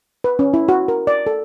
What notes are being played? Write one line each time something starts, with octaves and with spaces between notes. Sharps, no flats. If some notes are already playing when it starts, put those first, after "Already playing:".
B4
C#4
E4
F#4
A#4
D5
A4